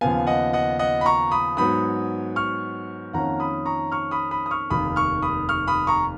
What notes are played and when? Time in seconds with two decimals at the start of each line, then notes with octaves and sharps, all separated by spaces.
0.01 D#2 C#3 F3 B3 F5 G#5
0.27 D#5 F#5
0.53 D#5 F#5
0.79 D#5 F#5
1.01 B5
1.06 A#5 C#6
1.32 B5 D#6
1.57 G#2 F#3 B3 B5 D#6
2.36 C#6 F6
3.13 F2 D#3 A#3 C#4 F#5 A#5
3.40 B5 D#6
3.66 A#5 C#6
3.92 C#6 F6
4.11 B5 D#6
4.31 B5 D#6
4.46 D#6
4.51 C#6 F6
4.70 F1 D#2 D#3 B5 D#6
4.96 C#6 F6
5.22 B5 D#6
5.49 C#6 F6
5.68 B5 D#6
5.87 A#5 C#6